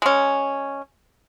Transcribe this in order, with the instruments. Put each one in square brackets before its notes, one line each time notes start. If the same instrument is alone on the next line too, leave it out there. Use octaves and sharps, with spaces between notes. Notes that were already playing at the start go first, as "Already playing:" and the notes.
[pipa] G#3 C#4